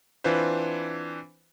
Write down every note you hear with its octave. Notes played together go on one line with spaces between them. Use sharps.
E3 C4 D4 F4 B4 C5